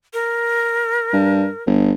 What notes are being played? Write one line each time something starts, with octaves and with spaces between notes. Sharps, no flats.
A#4
G2
G1